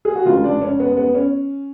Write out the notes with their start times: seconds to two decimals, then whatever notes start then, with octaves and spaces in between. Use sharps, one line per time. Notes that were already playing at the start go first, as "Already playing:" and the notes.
0.05 G#4
0.15 F#4
0.26 F1 F2 C#3 G#3 F4
0.44 D4
0.62 C#4
0.79 B3
0.97 B3
1.15 C#4